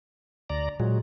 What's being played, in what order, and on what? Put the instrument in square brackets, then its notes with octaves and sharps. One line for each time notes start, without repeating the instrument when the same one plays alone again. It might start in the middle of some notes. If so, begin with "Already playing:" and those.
[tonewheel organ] D2 D5 A#5
[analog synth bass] A#2 [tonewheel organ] F#3 G#3